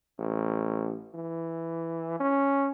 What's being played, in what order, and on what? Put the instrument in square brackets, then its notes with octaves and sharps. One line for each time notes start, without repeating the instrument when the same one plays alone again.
[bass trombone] A1
E3
C#4